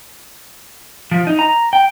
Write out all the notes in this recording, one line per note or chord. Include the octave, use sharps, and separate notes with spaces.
F3
D#4
A#5
G5